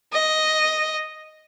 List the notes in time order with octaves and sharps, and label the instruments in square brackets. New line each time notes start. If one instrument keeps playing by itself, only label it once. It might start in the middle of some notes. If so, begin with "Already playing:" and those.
[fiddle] D#5